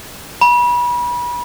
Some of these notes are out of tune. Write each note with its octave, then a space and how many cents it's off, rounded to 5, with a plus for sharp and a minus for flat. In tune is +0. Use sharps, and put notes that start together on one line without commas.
B5 -30